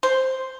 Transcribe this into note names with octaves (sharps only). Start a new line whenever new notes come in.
C5